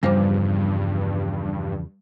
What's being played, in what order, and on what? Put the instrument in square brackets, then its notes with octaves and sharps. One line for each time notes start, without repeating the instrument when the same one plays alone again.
[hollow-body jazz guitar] E2 C#3 F3 [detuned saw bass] G2 [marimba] G3 C5 D6